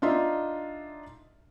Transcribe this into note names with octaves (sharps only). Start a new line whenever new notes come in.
D4 D#4 F4 D#5 E5